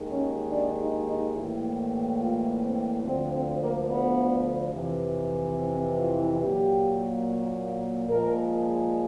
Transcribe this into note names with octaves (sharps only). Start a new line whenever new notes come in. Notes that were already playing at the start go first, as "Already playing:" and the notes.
Already playing: D#2 D#3 G#3
C#4
D4
D#4
D#4
A2 E3 G3 A#3 E4
F4
C4
D2 D3 F3 C4
C4
A#3
B3
F2 C3 E3
C4
F4
A#2 F#3 A#3 G4
A#2 F3 G#3 A#4